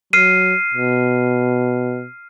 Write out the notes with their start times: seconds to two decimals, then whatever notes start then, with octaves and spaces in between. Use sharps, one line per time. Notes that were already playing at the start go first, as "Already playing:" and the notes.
0.13 F#3 F6 C7 D#7
0.74 B2